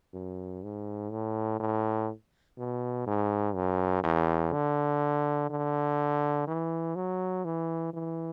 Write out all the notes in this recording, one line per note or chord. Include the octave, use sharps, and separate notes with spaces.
F#2
G#2
A2
A2
B2
G#2
F#2
E2
D3
D3
E3
F#3
E3
E3